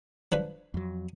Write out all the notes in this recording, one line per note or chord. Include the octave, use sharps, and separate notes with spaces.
F3 D4 B4
F2 F#3